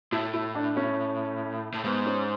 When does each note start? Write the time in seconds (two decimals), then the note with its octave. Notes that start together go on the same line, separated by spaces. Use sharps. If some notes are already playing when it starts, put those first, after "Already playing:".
0.12 A2 E4
0.34 E4
0.55 D4
0.77 C#4
1.74 A2
1.84 G#2 B3
2.06 C#4